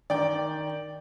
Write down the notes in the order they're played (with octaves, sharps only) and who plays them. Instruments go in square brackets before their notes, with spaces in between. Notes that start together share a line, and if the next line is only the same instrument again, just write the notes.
[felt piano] D#3 [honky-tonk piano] D5 G5